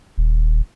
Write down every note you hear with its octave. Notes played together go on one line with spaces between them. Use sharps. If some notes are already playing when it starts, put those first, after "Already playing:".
D#1